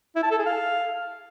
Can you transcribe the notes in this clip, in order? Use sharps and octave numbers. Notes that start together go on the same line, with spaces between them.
E4
A5
A4
G#4
F5